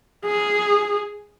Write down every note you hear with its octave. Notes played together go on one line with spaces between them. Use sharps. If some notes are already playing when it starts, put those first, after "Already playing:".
G#4